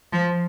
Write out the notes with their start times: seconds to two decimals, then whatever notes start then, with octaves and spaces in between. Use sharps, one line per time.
0.13 F3